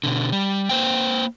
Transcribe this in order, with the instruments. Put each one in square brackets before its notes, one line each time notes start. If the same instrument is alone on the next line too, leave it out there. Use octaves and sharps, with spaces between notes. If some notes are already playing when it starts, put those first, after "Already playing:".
[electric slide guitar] B2 D3
G3
A#3 C5 G5